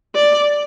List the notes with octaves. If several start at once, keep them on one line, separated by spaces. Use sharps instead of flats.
D5